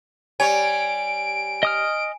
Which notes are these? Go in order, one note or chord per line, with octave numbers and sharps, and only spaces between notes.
G3 C#5 G#5 D7
D#5 D#6 F6